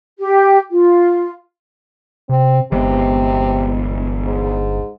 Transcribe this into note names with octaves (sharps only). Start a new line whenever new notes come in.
G4
F4
C3 C4
G1 C3 E3 G#3 B3
G#2